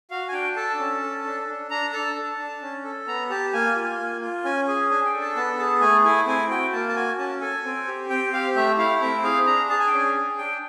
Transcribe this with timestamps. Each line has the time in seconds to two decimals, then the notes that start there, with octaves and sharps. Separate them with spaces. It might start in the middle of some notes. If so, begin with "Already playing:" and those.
0.11 F#4 F5
0.29 G#5
0.33 D4 G5
0.56 A4 A5
0.79 C#4
1.02 A4
1.25 D4
1.48 D4
1.70 D4 A#5
1.93 A4 A5
2.16 D4
2.39 D4
2.62 C#4
2.85 A4
3.07 B3 A#5
3.30 G4 A5
3.53 A#3 G#5
3.76 F4
3.99 A#3
4.21 F4
4.45 C#4 G#5
4.67 G#4 G#5
4.90 D4 G#5
5.05 G5
5.13 A4
5.21 A5
5.36 B3 A5
5.59 G#4 A5
5.81 A3 G#5
6.04 E4 G#5
6.27 C4 G#5
6.50 F#4 G5
6.72 A#3 A5
6.89 A5
6.95 F#4 G#5
7.18 C#4 A5
7.41 A4 G#5
7.64 C4
7.87 G4
8.10 C4 G5
8.33 G4 F5
8.56 A3 E5
8.78 E4 F5
9.01 C4 E5
9.24 G#4 F5
9.46 D4 A#5
9.70 G#4 A5
9.79 G#5
9.87 G5
9.93 C#4 G#5
10.15 G#4
10.38 D4 G5